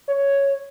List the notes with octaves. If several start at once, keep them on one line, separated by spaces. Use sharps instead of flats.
C#5